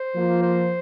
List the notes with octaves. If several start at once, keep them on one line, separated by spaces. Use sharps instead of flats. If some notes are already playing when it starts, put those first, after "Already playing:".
Already playing: C5
F3 A#3 F4
C5